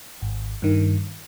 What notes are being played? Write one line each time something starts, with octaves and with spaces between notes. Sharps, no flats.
G#1
G2 D#3